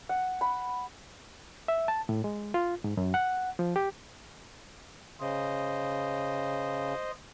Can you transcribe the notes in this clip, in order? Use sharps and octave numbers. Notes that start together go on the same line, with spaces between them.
F#5
B5
E5
A5
A2
G#3
F4
G#2
F#2
F#5
F3
G4
C#3 C5 D#5